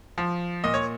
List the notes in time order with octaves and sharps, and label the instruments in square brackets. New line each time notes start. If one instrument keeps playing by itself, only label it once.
[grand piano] F3
A#2 D#5
C#5